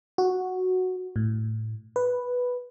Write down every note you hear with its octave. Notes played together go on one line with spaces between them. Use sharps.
F#4
A2
B4